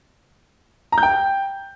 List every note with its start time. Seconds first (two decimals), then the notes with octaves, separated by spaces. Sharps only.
0.92 A#5
0.98 G6
1.03 G5